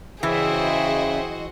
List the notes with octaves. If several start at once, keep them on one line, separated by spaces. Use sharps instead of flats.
C#3 E3 F#4 G#4 C5 D#5 E5 G5